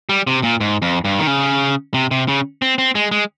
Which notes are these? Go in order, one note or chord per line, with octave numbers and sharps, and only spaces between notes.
G3
C3
A#2
G#2
F2
G2
D#3
C#3
C3
C3
C#3
C4
C4
G#3
G#3